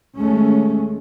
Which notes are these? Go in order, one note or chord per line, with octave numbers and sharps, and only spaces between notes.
D#2 G#3 A3 C#4